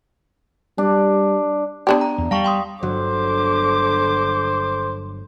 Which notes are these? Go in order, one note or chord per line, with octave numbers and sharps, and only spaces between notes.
G3 D4
B3 D4 G4
A#5
E2
G3 F5 A5 C#6
G5 C6 D#6
G1 D3 F#3 C5 D6